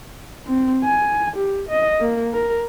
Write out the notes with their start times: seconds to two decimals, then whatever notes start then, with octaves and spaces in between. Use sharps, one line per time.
0.47 C4
0.84 G#5
1.37 G4
1.69 D#5
2.01 A#3
2.33 A#4